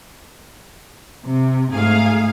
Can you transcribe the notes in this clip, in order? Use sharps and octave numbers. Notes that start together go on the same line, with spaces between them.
C3
G#2 A3 G#4 F5